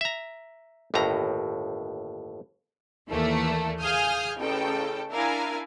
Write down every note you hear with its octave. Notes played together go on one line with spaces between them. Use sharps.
E5 A#5
G1 D#2 A2 A#5
D#2 E3 A3 A#3 A4 D5
G#4 F5 G#5 D#6 F6 G6
A1 C#3 A4 G5
D4 E4 A#4 F5 G#5